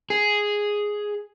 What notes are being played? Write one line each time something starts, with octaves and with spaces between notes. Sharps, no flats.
G#4